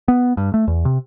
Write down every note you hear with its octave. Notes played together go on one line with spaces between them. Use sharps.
B3
G2
A3
E2
C3